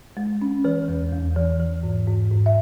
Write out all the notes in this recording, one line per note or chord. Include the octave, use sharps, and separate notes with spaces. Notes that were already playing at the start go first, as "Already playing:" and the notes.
G#3
C#4
E3 B4
E2
E2
E3
E3
G#2
G#2
G#2
E5